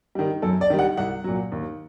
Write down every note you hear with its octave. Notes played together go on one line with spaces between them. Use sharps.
D#3 G3
F#2 A4
D5
D#3 G3
F#5
C2 F#5
A#2 F#3
D#2